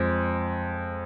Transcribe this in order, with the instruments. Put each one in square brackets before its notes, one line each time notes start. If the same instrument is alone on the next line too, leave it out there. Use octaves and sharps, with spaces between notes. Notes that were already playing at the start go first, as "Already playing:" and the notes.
Already playing: [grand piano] F2 G#3